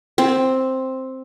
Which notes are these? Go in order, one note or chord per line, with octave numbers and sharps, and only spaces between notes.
C4 C5